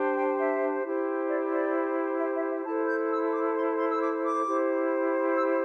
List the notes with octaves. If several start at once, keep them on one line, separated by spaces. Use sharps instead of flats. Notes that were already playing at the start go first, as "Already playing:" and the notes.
Already playing: D4 G4 C5
G5
E5
E4 G4 C5
D5
D5
E5
E5
E5
E4 A4 C5 A5
G6
E6
D6
C6
C6
E6
D6
D6
E4 G4 C5
E6